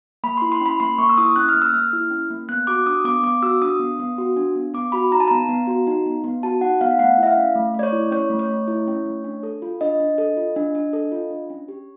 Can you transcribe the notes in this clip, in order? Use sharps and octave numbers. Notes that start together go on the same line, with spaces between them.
A#3 B5
E4 C6
C6
C#4 B5
A#3 C6
A#3 C#6
E6
E4 D#6
C#4 F#6
F6
A#3
E6
A#3 F6
E4
C#4
A#3
B3 F#6
F#4 D6
D4 D#6
B3 D6
B3 D6
F#4 E6
D4 D#6
B3
B3
F#4
D4
B3
B3 D6
F#4 B5
D#4 A#5
A5
B3 A#5
B3
F#4
D#4
B3
B3
F#4 A5
D#4 F#5
B3 F5
A3 F#5
E4
E5
F5
C#4
A3
A3 D5
C#5
E4
C#4 C#5
A3
C#5
A3
E4
C#4
A3
D4
A4
F4
D4 D#5
D4
A4
F4
D4
D4
A4
F4
D4
C#4
G4